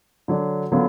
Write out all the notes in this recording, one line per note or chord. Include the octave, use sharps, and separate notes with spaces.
D3 F#3 D4
D3 F#3 B3 F4